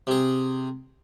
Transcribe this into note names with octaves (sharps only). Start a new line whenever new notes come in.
C3 G#4